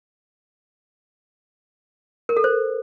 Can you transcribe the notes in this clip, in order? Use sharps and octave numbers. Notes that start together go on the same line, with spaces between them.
A#4
A4
C5